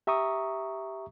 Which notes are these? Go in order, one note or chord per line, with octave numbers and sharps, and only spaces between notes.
G4 E5 A#5 C#6 D#6